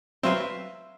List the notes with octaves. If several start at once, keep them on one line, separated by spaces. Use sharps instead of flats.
F#3 C4 B4 E5 F5 C6